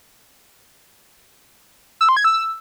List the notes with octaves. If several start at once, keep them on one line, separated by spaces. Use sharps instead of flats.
E6
C6
G#6
E6